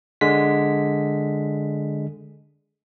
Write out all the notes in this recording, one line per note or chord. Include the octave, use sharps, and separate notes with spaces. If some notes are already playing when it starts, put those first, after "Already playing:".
D3 G#3 B6